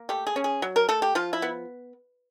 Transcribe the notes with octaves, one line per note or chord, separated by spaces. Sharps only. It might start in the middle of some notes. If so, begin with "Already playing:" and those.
Already playing: A#3
A3 G4
G#4
C#4
G#4
F#3
A#4
A3 A4
G4
F3 F4
E4
B3